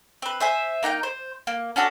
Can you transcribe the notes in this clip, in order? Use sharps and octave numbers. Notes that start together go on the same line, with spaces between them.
C4 B4
C5 E5 G#5
A#3 D#4 F#5 G5
C5
A#3
C#4 D4 F#4 A4